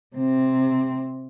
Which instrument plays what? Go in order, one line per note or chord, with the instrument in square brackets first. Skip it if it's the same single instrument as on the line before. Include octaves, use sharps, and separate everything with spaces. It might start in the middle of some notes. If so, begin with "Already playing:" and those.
[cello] C3 C4